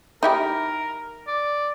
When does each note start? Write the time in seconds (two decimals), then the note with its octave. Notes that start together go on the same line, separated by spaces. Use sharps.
0.23 D#4 E4 G4 A#4
1.27 D5